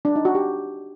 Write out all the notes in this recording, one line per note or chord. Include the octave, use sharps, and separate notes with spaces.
D4
D#4
F#4
G4